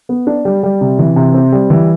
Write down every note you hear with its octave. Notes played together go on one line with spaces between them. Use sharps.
B3
D4
G3
G3
C3
E3
C3
C4
G3
E3